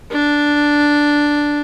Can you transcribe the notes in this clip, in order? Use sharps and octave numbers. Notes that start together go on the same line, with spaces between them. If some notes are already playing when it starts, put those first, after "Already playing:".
D4